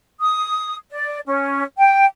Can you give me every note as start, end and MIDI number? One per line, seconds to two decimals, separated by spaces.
0.20 0.75 87
0.89 1.19 74
1.26 1.63 61
1.77 2.05 79